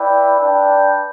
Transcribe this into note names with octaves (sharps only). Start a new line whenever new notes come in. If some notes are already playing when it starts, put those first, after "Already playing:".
Already playing: E4 B4 D5 G5
D4 B4 D5 G5